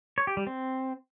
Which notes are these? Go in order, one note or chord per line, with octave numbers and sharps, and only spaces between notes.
C#5
G4
G3
C4